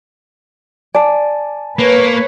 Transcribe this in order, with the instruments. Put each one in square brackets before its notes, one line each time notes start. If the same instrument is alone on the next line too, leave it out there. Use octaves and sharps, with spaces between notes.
[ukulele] D5 [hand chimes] G#5 A5
[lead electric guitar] A#3 [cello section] B4 C#5